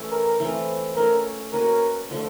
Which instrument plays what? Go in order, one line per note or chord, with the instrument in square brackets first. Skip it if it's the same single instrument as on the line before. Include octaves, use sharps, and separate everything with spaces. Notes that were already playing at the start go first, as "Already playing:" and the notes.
Already playing: [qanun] E3 A3 C#4
[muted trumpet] A#4
[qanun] E3 A3 C4 F4
[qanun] A3 C#4 F4 [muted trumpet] A#4
[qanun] A#3 C#4 F#4 B4 [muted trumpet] A#4
[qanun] D3 F3 A3